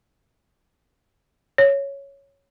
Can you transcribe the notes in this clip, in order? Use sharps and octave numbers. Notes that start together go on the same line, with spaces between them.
C#5